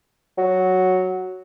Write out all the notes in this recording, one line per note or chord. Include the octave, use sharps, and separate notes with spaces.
F#3